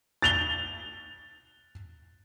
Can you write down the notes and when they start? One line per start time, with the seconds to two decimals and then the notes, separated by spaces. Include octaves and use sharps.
0.22 A6 F7 G7